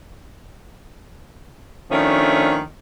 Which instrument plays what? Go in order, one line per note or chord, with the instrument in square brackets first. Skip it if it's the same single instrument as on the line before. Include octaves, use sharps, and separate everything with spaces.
[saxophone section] D#3 F3 A3 C#4 D4